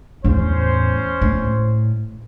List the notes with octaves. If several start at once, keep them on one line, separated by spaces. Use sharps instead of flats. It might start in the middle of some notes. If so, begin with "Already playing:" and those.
E2 A2 C#4 C5
A2